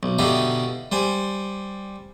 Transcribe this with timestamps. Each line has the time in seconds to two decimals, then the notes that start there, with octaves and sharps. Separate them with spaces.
0.03 B1
0.19 B2 D3 D#4 E4 G4 F5
0.92 G3 C5 G#5